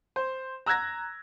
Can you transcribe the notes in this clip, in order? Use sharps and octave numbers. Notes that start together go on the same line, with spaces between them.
C5
A#5 E6 F#6 G#6 A#6